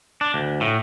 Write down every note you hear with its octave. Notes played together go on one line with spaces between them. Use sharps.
D4
D2
A2